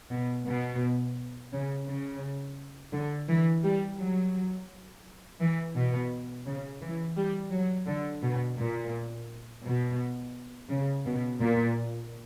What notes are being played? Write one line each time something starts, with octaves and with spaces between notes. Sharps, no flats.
B2
B2
C#3
C#3
D3
E3
G3
F#3
E3
B2
C#3
E3
G3
F#3
D3
B2
A#2
B2
C#3
B2
A#2